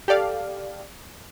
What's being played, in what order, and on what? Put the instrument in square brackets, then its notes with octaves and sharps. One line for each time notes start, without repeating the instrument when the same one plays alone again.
[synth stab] G4 A4 D5 F5